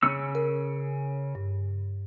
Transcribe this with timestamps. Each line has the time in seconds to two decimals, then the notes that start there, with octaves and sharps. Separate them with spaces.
0.03 C#3 C#4 E6
0.35 A#4
1.35 G2